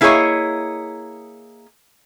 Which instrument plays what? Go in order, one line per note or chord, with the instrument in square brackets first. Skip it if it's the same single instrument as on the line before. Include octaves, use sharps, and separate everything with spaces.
[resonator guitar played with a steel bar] A#3 E4 G#4 A#4 C#5 D#5